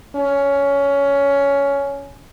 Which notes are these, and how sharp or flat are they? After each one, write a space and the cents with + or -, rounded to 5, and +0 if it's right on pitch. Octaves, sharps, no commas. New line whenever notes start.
C#4 +15